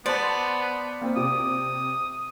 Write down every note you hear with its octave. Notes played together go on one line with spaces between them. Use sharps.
B3 C5 D5 A5
A#3 C4
C3 D6 D#6